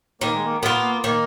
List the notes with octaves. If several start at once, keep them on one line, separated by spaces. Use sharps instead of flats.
D#3 A#3
G#3
A#3
A#3 B3 F4
D#3 A#3